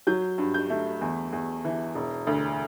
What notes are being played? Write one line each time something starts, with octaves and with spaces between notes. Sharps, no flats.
F#3 G6
G2
G6
A3
E2
E2
E3
E1
D2